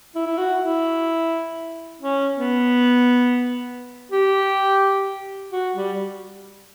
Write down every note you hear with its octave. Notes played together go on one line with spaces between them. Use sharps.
E4
E4
F#4
E4
C#4
B3
G4
F#4
G3